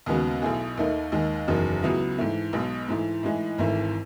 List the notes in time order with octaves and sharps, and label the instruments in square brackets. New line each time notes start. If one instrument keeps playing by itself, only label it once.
[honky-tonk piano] D#2 C#3 G#3 B3 F#4
B1 B2 A3 E4 G#4
D#2 D#3 A3 D#4
D#2 D#3 G#3 D#4
F#1 E2 D#3 F#3
C#2 C#3 F#3 B3 E4
G#2 E3 A3
B1 B2 G#3
G#2 E3 A3
A2 E3 G#3 D#4
G#1 G#2 E3 A3